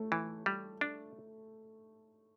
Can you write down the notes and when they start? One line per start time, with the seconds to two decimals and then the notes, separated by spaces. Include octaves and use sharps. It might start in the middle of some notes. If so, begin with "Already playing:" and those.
Already playing: A3
0.12 E3
0.46 G3
0.81 D4